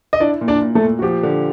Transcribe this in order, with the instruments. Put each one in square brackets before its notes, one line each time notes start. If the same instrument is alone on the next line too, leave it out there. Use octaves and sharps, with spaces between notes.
[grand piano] D#5
[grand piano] D4 D5 [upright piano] E4
[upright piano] A#2
[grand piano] D4 D5
[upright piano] A#2
[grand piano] A3 A4
[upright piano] A#2
[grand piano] F#4
[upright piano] F3 [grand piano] G4
[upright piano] D3